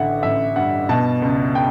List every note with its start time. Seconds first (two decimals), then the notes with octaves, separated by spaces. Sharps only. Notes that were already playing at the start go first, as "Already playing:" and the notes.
Already playing: A1 D3 E5 F#5
0.23 A1 E5
0.56 G2 F#5
0.89 B2 A5
1.22 C#2
1.55 G5